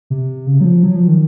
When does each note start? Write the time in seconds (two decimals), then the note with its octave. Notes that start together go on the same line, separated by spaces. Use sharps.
0.10 C3
0.46 C#3
0.60 F#3
0.65 F3
0.83 F#3
0.96 F3
1.08 D#3